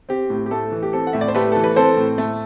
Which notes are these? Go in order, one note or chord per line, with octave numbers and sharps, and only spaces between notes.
C4 G4
A2
G4
A3 A4
E3
G4
C4 A4
F#5
A2 E5
D5
C5
A3 G4 B4
E3 A4
B4
C4 A4 C5
A2
A3